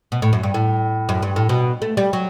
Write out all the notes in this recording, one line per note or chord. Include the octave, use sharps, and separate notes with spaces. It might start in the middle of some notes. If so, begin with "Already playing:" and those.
B2
A2
F#2
G2
A2
F#2
G2
A2
B2
A3
G3
F#3